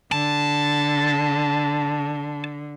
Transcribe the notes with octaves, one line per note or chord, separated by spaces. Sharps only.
D3 A5